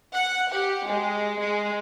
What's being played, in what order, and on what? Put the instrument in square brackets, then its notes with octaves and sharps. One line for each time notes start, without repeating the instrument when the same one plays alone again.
[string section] F#5
G4
G#3
G#3